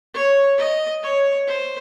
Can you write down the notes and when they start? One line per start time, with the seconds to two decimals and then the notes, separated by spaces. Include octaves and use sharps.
0.14 C#5
0.58 D#5
1.03 C#5
1.47 C5